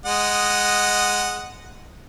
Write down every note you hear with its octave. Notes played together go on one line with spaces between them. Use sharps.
G#3 D#5 F#5